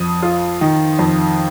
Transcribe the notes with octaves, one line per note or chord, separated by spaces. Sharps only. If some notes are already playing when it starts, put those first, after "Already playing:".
Already playing: F2 D#6
F4
D#3
F2